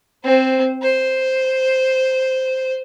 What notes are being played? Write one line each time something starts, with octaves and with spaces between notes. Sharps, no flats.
C4 C5
C5